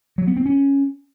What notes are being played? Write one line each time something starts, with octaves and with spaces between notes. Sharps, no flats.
F#3
B3
C4
C#4